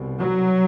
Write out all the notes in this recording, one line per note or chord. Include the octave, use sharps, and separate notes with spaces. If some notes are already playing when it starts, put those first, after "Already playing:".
Already playing: C2 B2
F#3